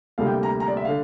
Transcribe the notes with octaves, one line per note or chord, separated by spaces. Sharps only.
D2 C3 G3 A#3 F5
G5
A#5
A#5
D5
E5
D3 F5